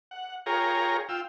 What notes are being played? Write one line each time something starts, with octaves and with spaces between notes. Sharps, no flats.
F#5
F4 G#4 A#4 C#5 G5 A#5
F4 G5 E6